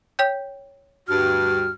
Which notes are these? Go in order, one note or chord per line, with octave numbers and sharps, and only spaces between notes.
C#5 G5 G6
D2 G2 F#4 F6